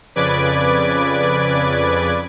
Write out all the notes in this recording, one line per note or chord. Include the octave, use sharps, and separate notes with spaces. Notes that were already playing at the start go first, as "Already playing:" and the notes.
F2 C#3 B4 D5 D6 G#6